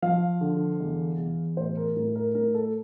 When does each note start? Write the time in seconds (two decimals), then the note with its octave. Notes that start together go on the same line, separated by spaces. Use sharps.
0.02 F3 F5
0.41 D3
0.80 E2
1.18 E2
1.57 A2 C5
1.77 A#4
1.96 A2 A#4
2.16 A#4
2.35 A2 A#4
2.54 A4